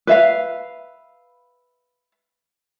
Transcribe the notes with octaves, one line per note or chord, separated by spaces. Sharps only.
B4 E5 F5